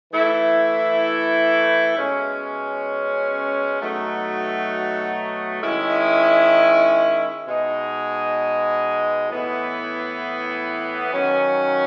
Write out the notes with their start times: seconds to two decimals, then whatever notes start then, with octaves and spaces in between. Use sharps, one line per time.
0.12 E3 A3 E4
1.96 B2 G#3 C#4
3.79 B2 F#3 A3 D#4 F#4
5.63 D#3 G#3 C#4 E4
7.46 B2 G#3 D#4
9.30 A2 E3 B3 E4
11.13 D#3 F#3 C#4